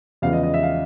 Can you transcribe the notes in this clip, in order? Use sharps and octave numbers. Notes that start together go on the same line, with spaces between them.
E2 C#3 F3 G#3 F5
D#5
D#5
E5
F5